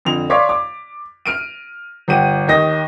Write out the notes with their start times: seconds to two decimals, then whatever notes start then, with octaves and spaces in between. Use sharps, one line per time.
0.05 F2 D3 F7
0.30 C#5 D5 F5 C6 D6 B6
0.49 D6
1.26 F6 D7 D#7
2.08 G1 G4 F#5 D#7
2.48 D#2 D#3 D#5 A#6